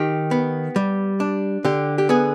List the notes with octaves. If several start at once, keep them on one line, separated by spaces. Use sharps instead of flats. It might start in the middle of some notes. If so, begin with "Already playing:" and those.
Already playing: D#3 G4
B3
G3
D4
D3 G4
G4
B3 G#4